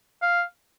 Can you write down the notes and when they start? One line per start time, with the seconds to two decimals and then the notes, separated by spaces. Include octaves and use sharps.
0.22 F5